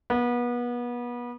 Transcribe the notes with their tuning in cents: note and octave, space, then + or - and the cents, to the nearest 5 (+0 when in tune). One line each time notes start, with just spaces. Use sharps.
B3 -30